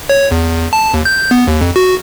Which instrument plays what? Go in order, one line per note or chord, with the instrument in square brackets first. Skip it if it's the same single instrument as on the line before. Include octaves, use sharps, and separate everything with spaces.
[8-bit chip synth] C#5
E2
A5
D#2
G6
B3
D#2
F2
F#4